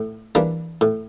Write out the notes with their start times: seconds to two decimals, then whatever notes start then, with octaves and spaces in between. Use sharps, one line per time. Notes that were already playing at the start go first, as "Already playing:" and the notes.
Already playing: A2
0.35 E3 G3 A#3 D4
0.81 A2